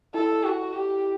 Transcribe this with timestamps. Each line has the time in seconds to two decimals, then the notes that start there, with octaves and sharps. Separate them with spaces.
0.14 E4 A4
0.44 F#4
0.73 G4